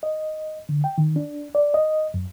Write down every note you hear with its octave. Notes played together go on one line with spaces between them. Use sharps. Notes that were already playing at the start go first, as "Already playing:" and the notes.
D#5
D3
G5
D#3
D4
D5
D#5
F#2